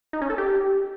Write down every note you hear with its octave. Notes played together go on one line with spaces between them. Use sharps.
D#4
C#4
A4
G4